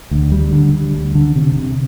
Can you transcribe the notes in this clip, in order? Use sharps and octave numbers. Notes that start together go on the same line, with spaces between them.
D2
G3
D3
G3
D2
D3
C3
C3